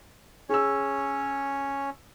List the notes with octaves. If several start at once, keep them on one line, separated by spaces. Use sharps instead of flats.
C#4 G#4 C#5 E6